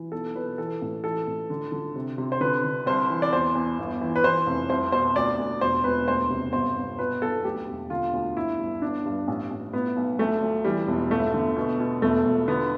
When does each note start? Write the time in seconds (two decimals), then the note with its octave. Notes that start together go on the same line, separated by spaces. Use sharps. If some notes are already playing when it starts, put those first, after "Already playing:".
Already playing: E3
0.12 B1 A4
0.35 B2 B4
0.58 E3 A4
0.82 A1
1.04 E3 A4
1.27 A1
1.50 D3
1.72 D3
1.96 C3
2.18 C3
2.32 C5
2.41 D3 B4
2.64 D3
2.86 C2 C5
3.10 E3
3.22 D5
3.33 E2 C5
3.55 E2
3.79 G1
4.01 E3
4.16 B4
4.24 E3 C5
4.47 F1
4.69 C2 C5
4.92 B2 C5
5.16 D2 D5
5.38 D2
5.61 E1 C5
5.84 E1 B4
6.08 D2 C5
6.30 C3
6.53 G1 C5
6.77 G1
6.99 B2 B4
7.22 B1 A4
7.44 D2 G4
7.68 E1
7.90 D3 F4
8.13 D2
8.37 G1 E4
8.59 G2
8.82 G1 D4
9.05 G2
9.28 A1
9.51 A1
9.73 A2 B3
9.96 B1
10.19 D2 A3
10.42 D2
10.65 E3 G3
10.88 E1
11.10 G1 A3
11.34 D3
11.56 B2
11.80 B2
12.02 E1 A3
12.25 E1
12.48 D3 B3